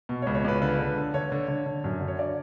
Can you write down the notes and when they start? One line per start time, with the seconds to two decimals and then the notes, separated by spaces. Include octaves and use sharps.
0.09 B2
0.22 C#5
0.27 C#2
0.35 C#5
0.44 C#2 B4
0.62 D3 B4
0.79 D3
0.97 D3
1.14 D3 C#5
1.32 D3
1.48 D3
1.66 D3
1.84 F#2
2.01 D3
2.08 C#5
2.19 D5